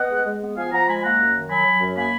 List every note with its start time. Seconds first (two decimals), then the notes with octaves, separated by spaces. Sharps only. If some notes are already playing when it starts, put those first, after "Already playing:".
Already playing: B3 D#5 F#5
0.10 G#3
0.25 G#3
0.40 B3
0.55 F3 F5 G#5
0.71 F3 F#5 A#5
0.87 G#3 G#5 B5
1.02 A#3 F#5 A#5
1.18 F#2
1.33 D#3
1.49 F#3 G#5 B5
1.64 F#3
1.80 F#2
1.96 A#3 G#5 B5